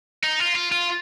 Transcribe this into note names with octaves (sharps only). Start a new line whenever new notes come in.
D#4
F4
F4
F4